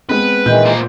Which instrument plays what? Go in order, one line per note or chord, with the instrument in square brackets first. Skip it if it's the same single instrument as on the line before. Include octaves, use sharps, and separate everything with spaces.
[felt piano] G#3 B3 C4 [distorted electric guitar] B4
[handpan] A#2 [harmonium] D#3 E3 G#3 [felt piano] G6
[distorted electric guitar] A#3 C5